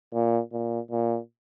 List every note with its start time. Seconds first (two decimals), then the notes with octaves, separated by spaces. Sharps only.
0.13 A#2
0.53 A#2
0.91 A#2